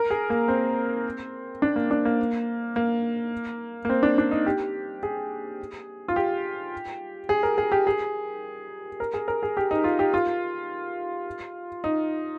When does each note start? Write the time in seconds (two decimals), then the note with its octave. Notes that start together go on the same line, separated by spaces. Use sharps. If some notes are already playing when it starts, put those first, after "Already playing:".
Already playing: A#4
0.10 G#4
0.30 A#3
0.48 C4
1.62 D4
1.76 A#3
1.91 D4
2.05 A#3
2.76 A#3
3.85 A#3
3.89 C4
4.03 D4
4.18 D4
4.31 D#4
4.46 G4
5.03 G#4
6.08 F4
6.16 G4
7.29 G#4
7.43 A#4
7.58 G#4
7.72 G4
7.87 G#4
9.00 A#4
9.14 G#4
9.28 A#4
9.43 G#4
9.57 G4
9.71 D#4
9.84 F4
9.99 G4
10.14 F4
11.84 D#4